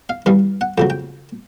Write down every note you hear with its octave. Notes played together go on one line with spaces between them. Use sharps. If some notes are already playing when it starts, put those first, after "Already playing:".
F5
G2 E3 G3 F5
F#5
F2 C#3 F#3 G5
G5